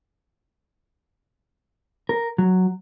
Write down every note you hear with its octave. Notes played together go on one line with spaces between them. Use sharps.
A#4
F#3